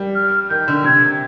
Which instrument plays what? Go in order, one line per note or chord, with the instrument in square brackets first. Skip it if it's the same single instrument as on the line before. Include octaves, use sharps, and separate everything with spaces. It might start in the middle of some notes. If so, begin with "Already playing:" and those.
Already playing: [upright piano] G3
[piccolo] F6
[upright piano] D#3 [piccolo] G6
[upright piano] D3
[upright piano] C3 [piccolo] G#6